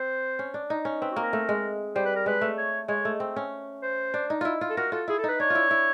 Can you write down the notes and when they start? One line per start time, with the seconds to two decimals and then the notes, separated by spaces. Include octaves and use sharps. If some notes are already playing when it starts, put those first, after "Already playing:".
Already playing: C4 C5
0.39 C#4
0.54 D4
0.70 D#4
0.85 C#4
1.01 C4 B4
1.11 F#4
1.16 A#3
1.22 A#4
1.33 A3
1.49 G#3
1.95 G3 C5
2.05 B4
2.15 A#4
2.26 G#3 B4
2.41 A3
2.58 C#5
2.88 G#3 C#5
3.05 A3
3.20 C4
3.36 C#4
3.82 C5
4.14 D4
4.30 D#4
4.41 E4 F4
4.61 F4
4.69 A4
4.77 F#4 A#4
4.92 F4 A4
5.08 E4 G#4
5.18 A4
5.24 D#4 B4
5.40 D4 C#5
5.50 E4 F4
5.71 E4